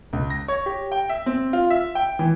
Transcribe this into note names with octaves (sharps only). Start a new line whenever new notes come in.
C#2
A#6
C#5
G4
G5
E5
C4
F4
E5
G5
E3